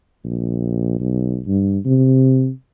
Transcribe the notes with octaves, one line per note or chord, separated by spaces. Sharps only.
A#1
B1
G2
C3